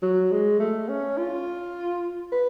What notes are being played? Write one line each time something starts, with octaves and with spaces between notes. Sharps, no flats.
F#3
G#3
A3
C#4
F4
B4